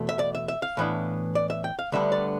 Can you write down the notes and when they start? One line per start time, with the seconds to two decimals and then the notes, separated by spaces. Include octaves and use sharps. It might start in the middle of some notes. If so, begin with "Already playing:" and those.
Already playing: E2 B2 A3
0.09 E5
0.19 D5
0.35 E5
0.48 E5
0.62 F5
0.77 A2 E3 B3 D4
1.35 D5
1.50 E5
1.64 G5
1.79 F5
1.92 D2 D3 G3 B3 D4 E5
2.12 D5